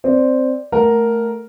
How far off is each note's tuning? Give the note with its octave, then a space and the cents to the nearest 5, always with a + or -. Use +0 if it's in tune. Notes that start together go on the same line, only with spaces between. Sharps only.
C4 +0 D5 +0
A3 +0 A#4 +0 F#5 +0